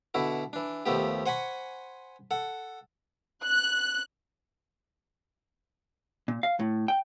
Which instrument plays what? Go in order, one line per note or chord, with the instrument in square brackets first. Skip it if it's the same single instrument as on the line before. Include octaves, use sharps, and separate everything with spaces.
[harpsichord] B2 D3 E4 F#4
E3 D4
D#2 F3 A3 B3 G4
C5 F#5 G#5 B5 C#6
A4 F#5
[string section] F#6
[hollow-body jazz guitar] A#2
F5
A2
G5